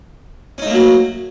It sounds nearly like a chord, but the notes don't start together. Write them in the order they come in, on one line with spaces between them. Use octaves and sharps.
C#4 D#4 A3 A#3 F#3